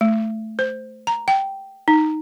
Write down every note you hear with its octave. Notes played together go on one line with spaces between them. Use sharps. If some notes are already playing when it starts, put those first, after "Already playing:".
A3
C5
A#5
G5
D#4